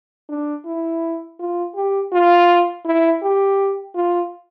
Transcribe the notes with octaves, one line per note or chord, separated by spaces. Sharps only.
D4
E4
F4
G4
F4
E4
G4
F4